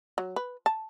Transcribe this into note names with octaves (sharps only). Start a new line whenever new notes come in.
F#3
B4
A5